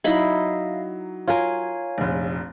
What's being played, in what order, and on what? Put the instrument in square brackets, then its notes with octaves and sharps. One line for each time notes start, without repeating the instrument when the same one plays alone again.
[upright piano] F#3 [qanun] D#4 E4 B5 [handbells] E5 F5 A#6
[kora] F4 A#4 [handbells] C#5 F5 G#5
[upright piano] F1 A#1